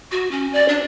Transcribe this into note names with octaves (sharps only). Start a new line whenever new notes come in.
F#4
C#4
D5
D4